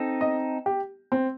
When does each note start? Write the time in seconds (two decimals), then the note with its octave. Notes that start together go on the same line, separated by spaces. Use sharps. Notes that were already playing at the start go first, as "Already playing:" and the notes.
Already playing: C4 D#4 A4
0.21 D#5
0.66 G4
1.12 C4